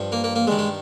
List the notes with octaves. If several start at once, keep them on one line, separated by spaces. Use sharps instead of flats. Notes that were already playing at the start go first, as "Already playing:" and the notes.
Already playing: G2 F3
A#3
A#3
A#3
G2 D#3 G#3
G#3